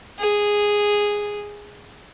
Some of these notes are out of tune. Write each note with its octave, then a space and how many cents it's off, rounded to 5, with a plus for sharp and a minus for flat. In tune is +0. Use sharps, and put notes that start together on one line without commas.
G#4 -5